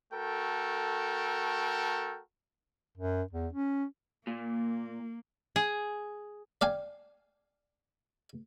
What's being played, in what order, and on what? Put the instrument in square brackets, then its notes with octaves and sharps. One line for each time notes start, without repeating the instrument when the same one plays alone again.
[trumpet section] A3 F#4 A4 A#4 G5
[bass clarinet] F#2
E2
C#4
[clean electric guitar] A#2 [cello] A#3
[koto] G#4
[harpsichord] D5 F5 G5 G#5